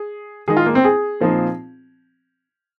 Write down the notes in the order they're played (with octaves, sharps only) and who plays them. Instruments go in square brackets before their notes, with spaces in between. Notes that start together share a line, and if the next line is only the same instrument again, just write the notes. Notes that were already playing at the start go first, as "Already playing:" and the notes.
Already playing: [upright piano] G#4
[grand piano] D#3 G#3 D#4 [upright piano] G#4
[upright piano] F4
A#3
C4
G#4
[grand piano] A#2 F3 C4 D#4